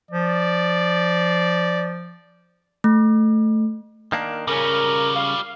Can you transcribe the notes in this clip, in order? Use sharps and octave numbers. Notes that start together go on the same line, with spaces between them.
F3 D5
A3
D#3 A#3 D4
C#3 G3 C#4 F4 A#4
F5